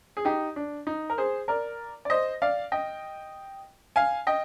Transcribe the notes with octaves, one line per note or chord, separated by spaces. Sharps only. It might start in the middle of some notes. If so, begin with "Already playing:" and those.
G#4
D#4 G4
D4
D#4
A#4
G#4 C5
A#4 D5
D5
C5 D#5
D5 F5
D#5 G5
F5 G#5
D#5 G5